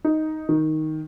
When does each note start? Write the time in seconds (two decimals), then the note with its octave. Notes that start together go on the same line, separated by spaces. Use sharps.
0.04 D#4
0.49 D#3